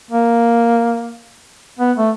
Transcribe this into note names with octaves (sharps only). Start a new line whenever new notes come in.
A#3
B3
A3